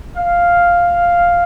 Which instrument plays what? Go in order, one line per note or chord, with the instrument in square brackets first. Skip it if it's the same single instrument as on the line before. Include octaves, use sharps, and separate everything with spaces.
[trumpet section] F5